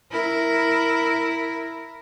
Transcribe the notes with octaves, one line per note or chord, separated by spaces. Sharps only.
E4 A#4